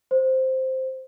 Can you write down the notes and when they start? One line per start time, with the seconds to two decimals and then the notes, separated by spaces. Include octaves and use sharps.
0.11 C5